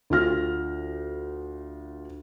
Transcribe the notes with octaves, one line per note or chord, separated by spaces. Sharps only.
D2 F4 F6 A#6